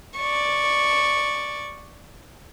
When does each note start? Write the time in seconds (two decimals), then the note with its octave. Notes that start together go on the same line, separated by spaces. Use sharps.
0.18 D5 C#6